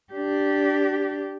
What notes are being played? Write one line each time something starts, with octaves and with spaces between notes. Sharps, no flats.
D4 G4